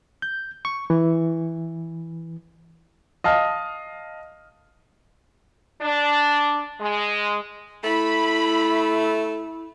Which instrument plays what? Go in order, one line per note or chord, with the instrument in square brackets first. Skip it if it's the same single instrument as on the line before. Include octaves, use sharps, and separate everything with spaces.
[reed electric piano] G6
C#6
E3
[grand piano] D#5 F5 A5 F6
[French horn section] D4
G#3
[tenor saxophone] A3 [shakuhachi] E4 [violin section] B5